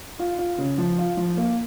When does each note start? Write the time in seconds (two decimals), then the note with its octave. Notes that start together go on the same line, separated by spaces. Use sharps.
0.19 F4
0.38 F4
0.58 C#3
0.78 F3
0.98 F4
1.17 F3
1.37 A#3